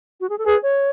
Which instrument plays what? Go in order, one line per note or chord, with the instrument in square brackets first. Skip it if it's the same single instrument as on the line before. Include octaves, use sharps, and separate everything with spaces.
[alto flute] F#4
G#4
A4
[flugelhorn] G#4 [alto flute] B4
[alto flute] C#5